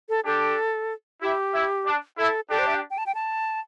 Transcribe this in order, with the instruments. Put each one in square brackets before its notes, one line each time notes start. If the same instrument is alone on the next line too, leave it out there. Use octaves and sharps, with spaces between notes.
[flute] A4
[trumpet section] D4 G4 [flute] A4
[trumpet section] E4 [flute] G4
[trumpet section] E4
D4
[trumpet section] E4 [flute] A4
[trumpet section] D4 G4 [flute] A4
[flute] C5
E5
G5
G5
A5
G5
A5